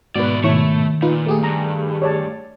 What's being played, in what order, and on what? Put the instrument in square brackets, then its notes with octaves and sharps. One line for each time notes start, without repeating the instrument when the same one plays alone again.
[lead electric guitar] D#2 D5 [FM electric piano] G#2 B2 [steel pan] F#4 B4
[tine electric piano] D#3 [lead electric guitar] A3 [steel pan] E4 C#5 C#6
[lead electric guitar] A#2 [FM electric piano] D#4 F4 B4
[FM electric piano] A3 G4 G#4
[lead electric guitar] G2 [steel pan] A#5
[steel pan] C#5 D5 A5